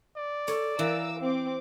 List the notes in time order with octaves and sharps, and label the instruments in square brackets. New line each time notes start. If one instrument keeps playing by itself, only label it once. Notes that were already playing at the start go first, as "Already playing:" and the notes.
[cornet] D5
[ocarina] A4 [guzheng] C#5
[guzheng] E3 [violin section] A#4 D6 E6 [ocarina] F5
[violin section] C4 D6